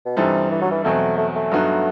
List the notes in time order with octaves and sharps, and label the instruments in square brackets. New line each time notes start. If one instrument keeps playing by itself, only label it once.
[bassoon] B2
[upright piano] G2 E3 G3 D#4 A4 [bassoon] C3
[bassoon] E3
F#3
E3
[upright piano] E2 B2 F#3 C4 [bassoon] A3
[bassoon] A3
A3
[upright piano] G2 F#3 B3 D#4 F#4